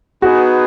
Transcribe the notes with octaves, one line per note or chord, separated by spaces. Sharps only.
B3 D#4 F#4 G#4 B4